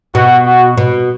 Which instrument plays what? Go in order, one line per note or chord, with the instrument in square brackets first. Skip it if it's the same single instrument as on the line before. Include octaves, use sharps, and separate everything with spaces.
[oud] B2 [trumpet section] F#4
[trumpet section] F#4
[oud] B2